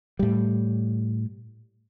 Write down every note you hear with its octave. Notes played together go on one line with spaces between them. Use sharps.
A2 G3